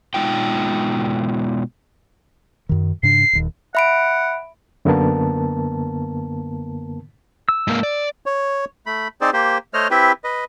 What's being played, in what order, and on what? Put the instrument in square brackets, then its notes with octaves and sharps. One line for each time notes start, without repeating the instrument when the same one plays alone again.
[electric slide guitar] B2 G#3 D#4 F4 G5
[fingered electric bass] F#2 D#3
[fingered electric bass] G#2 C#3 D4 [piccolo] C7
[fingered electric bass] D#1 D#2
[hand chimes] E5 B5 D7 [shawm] F#5
[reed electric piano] F#2 D3 A#3 B3 A#4 A5
[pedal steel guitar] E6
[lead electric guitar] G#2 A#3
D5
[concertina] C#5
A3 B5
C4 D#4 G#4 C5 D5
A#3 G4 C5
A3 C5 C#5 D#5 F6
C4 E4 G4 B4 E5
B4 D#5